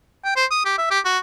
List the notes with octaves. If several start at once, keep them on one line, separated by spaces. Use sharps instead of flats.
G5
C5
D#6
G4
E5
G4
F#4